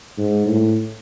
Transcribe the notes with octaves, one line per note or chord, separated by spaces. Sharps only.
G#2
A2